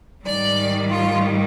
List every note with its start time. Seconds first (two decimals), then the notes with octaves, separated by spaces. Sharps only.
0.25 G#2 D#3 G3 D5
0.90 F4